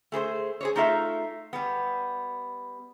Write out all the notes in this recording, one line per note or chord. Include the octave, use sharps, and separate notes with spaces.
A3 G#4 B4 C5
G#4 C5 C#5
A3 D#4 F4 A4 E5
G3 B3